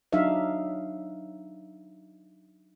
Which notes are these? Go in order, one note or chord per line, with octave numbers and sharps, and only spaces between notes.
F#3 D4 D#4 E5 F5